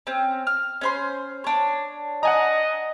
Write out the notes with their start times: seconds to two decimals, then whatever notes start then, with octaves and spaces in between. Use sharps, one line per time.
0.07 C4 C#4
0.47 F6
0.81 C#4 C5 C6
1.44 D4 C#5
2.23 D#5 F#5 G#5 A#5